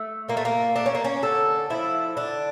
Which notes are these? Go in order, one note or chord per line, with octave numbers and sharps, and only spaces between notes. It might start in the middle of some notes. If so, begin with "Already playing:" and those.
Already playing: A3
A#2 A#3
A3
A#3
A3 D4
C#4
A#3
C#4
D3 A4
F3 A3 E4
D3 D4